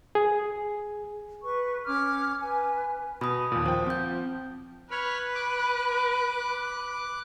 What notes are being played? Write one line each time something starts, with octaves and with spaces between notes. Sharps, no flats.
G#4
B4 C#6
C#4 D6 F6 G#6
B4 G#5
B2 B5 D#6
D#2 A#2
F3 C5 G5
C4 G6
B4 C#5 B5 F6
D6 F#6